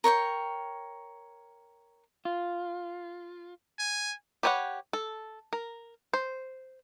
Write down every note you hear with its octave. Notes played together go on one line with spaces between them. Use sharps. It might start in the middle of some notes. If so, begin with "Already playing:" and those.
A#4 C#5 G5 C#6
F4
G#5
G4 B4 C#5 D#5 F#5
A4
A#4
C5